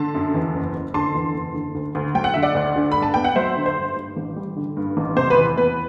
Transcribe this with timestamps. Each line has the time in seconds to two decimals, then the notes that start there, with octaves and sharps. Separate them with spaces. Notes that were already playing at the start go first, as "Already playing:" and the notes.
Already playing: D3 A5 C6
0.14 F#2
0.34 E2
0.54 F#1
0.74 F#1
0.94 D3 A5 C6
1.15 E2
1.34 F#1
1.54 D3
1.75 D2
1.95 D2
2.15 F#3 G5
2.24 F#5
2.34 D3 E5
2.43 D5 F#5
2.55 D2
2.76 D3
2.92 G2 B5
3.03 A5
3.14 B3 G5
3.24 F#5
3.36 F#3 C5 E5
3.56 D3
3.66 C5
3.76 G2
3.96 G2
4.16 A1
4.36 G3
4.56 D3
4.77 G2
4.97 A1
5.16 C3 C5
5.30 B4
5.37 E2
5.57 B3 B4